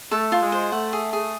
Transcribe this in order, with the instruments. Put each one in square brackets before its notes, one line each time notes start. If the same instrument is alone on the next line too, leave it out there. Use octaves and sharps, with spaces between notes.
[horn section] A3 [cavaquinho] A4
[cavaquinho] F4
[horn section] G#3
[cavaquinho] C5
[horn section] A3 [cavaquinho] F#5
[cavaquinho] G#4
G#4